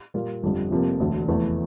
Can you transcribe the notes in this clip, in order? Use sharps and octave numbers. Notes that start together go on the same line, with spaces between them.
A#2 G3 A#3 F4
G1 F2 D3 G3
F1 F2 C3 F3 A#3
E1 D2 D3
F1 E2 E3 A3